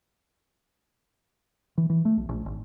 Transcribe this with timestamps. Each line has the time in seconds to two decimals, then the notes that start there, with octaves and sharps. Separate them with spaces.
1.78 E3
1.90 E3
2.05 A3
2.17 B1
2.29 A#1
2.46 G#1